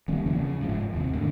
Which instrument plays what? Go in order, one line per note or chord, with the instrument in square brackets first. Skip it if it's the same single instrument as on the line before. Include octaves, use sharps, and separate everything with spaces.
[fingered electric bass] D#3 G3 A#3 C#4
E2 C#3 F3
C#3
F1 G#2 C3 F3
D#2 C3
D2 G#2 D3 D4